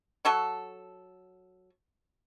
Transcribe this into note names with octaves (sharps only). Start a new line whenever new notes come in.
F#3 A4 C#6